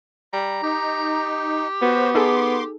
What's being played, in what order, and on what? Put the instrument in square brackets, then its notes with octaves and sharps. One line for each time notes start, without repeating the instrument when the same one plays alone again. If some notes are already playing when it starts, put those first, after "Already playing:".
[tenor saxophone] G3 [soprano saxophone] A#5
[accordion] D#4 [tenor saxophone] G4
[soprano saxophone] B3 [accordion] F#4 C5
[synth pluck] D#4 G#4 A4 [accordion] C6 D6